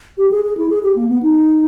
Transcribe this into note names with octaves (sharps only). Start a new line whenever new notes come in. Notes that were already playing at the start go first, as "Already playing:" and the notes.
G4
G#4
G#4
E4
G#4
G4
A#3
B3
D#4